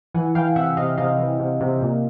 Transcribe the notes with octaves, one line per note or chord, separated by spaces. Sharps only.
E3 F#5 G#5
E3 F5 G5
C3 E5 F#5
C3 D#5 F5
C3 D#5 F5
E3
C3
C3
A#2